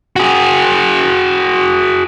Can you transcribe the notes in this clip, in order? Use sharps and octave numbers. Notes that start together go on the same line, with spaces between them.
F#4 G#4